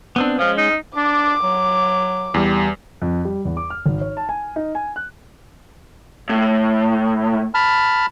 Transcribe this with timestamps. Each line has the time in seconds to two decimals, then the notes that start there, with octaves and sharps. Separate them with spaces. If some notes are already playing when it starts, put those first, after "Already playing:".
0.16 B3 C4 D4
0.39 F3 G#3 C#4
0.58 D#4
0.96 D4 D6
1.43 F#3
2.34 E2 G3
3.02 F2
3.25 G3
3.45 E2
3.57 D6
3.70 F6
3.86 G#1
4.01 C#5
4.17 A5
4.29 G#5
4.56 D#4
4.75 G#5
4.96 F#6
6.29 A2
7.54 A5 B5 F6